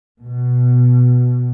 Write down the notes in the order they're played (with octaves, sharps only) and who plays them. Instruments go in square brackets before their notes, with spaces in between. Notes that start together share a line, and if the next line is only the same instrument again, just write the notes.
[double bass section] B2